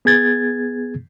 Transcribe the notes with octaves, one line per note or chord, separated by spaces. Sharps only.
B3 G#4 G#6 A6